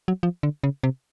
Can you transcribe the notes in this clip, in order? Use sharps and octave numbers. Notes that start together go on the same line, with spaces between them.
F#3
F3
D3
C#3
C3